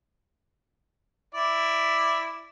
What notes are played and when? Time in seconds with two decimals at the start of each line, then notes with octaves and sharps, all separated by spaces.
1.35 E4 D5